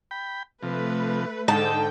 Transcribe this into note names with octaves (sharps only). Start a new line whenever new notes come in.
G5 B5
C3 F3 A3 B4
G#2 D3 D#4 G5 A5